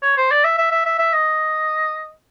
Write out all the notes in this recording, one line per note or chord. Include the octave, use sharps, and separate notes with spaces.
C#5
C5
D5
E5
E5
E5
E5
E5
D#5